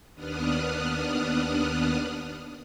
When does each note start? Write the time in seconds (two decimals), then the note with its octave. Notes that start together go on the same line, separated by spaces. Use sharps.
0.14 D#2 B3 D4 D#6 F6 F#6